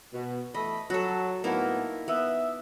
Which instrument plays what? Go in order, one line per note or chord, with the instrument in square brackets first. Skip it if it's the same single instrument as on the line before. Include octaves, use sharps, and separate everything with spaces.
[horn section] B2
[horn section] E3 A3 B5 [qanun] D#5
[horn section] F#3 [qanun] F#4 A4
[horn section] A2 B3 [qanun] A#3 D#4 E4
[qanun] B3 [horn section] E5